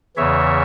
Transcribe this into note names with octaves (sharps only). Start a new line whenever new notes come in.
E2 C#3 E3 C#5 E5